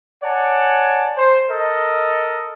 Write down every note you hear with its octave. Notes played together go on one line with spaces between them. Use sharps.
C#5 D5 F#5 G#5 A5
C5
A4 A#4 D#5